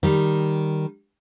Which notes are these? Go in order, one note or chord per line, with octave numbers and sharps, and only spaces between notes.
D#3 G3